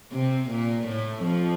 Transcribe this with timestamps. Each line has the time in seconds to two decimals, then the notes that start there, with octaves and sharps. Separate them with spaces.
0.12 C3 C4
0.49 A#2 A#3
0.87 A2 A3
1.24 F2 F3